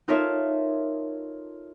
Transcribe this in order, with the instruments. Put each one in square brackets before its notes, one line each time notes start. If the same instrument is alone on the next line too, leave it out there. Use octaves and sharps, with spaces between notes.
[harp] D#4 F4 A4 A#4 C#5 E5